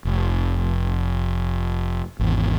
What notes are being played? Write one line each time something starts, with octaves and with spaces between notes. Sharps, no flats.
F1
G#1 E2